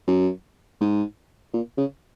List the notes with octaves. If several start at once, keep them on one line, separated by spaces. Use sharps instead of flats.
F#2
G#2
A#2
C#3